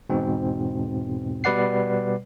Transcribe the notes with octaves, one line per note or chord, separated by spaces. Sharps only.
E2 G#2 B2 C4
B2 G3 B4 D5 F#5 C7